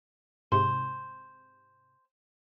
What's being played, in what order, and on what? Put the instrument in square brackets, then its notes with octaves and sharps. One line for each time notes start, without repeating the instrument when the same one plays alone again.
[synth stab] G#2 C3 [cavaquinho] C5